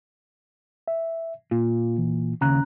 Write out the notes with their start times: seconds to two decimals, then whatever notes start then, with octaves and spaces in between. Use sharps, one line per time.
0.88 E5
1.51 A#2 F4
1.98 E3
2.41 D#2 C#3 C#4 A#5 F#6